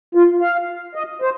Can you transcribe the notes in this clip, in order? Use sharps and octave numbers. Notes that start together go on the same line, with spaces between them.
F4
F5
D#5
C5